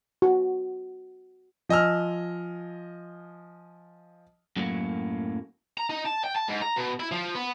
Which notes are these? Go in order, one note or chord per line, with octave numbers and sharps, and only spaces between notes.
F#4
F3 D#5 G#5 E6 F6
F#2 A2 F#3 G3 A#3
A#5
D#4
A5
G5
A5
G#2
A#5
B2
E4
F3
B3